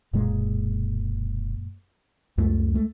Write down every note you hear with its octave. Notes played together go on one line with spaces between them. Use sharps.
E1 F#2 A#2 G#3
C#2 F#2 A3
G#3 A3